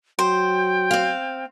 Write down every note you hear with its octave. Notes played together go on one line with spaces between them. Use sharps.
F#3 C5 G5
C4 F5